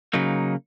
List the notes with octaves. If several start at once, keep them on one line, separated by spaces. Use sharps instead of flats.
C#3 F#3 A#3 D#4